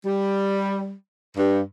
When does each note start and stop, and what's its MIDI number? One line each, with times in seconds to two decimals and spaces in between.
0.05 0.93 55
1.37 1.61 43